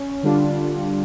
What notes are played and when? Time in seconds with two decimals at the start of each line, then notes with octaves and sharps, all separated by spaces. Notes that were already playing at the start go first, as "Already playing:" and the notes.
Already playing: C#4
0.23 D3 G3 D4 F4